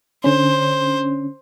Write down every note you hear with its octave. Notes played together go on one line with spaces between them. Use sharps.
D3 C#4 C5